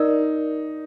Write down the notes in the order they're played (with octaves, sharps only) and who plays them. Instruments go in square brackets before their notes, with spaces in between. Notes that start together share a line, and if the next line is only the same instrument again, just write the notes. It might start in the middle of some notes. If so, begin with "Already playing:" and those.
Already playing: [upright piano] D#4 [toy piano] A#4 D5